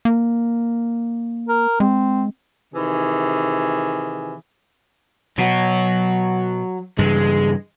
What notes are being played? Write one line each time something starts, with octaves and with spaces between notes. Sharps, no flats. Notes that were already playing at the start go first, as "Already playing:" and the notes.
A#3
A#4
G#3 C4
C3 D#3 E3 G#4
B2 F#3 F#4
G2 C#3 E3 G#3